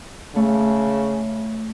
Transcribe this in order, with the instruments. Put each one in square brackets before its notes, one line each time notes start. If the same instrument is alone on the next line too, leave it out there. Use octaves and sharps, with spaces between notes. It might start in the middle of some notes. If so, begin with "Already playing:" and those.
[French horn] C#3 [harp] A3